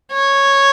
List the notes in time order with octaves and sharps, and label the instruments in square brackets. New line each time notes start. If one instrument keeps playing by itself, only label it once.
[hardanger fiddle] C#5